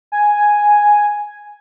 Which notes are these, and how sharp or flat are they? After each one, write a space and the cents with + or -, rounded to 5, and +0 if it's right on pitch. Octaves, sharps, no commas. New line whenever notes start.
G#5 +0